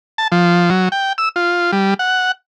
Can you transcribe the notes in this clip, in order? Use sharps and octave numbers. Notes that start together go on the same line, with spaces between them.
A5
F3
F#3
G5
E6
F4
G3
F#5